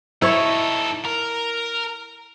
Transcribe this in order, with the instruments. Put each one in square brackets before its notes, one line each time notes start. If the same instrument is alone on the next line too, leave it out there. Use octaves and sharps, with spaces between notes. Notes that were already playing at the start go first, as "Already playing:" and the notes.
[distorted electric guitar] D#4 A4 [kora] E4 C#5
[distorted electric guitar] A#4